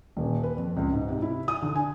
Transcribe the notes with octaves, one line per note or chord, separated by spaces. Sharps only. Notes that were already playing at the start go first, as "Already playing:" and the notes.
D#1
B4
F2
C#2
G#2
C3
E4
D#6
D3
G#5